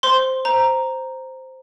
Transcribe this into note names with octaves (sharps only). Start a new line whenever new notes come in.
C5 C6
C5 A#5